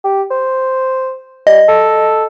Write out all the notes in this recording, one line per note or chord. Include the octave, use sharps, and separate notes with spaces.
G4
C5
G3 D#5
A4